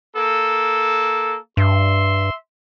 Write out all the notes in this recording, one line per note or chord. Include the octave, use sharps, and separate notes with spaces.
A#3 A4
G2 E5 C6